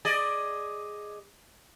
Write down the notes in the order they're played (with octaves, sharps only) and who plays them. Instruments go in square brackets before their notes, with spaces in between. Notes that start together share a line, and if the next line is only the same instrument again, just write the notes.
[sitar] G#4 D5 D#5